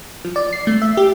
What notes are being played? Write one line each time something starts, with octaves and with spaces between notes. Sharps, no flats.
F3
D5
C7
A3
E5
G4